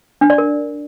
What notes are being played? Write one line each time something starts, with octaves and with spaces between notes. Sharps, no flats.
D4
D5
A#4